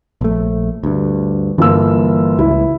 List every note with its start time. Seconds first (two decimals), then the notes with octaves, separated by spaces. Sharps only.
0.21 A#1 A3
0.84 D2 G2
1.58 G1 E3 A#3 F4 E6
2.39 C#2 E4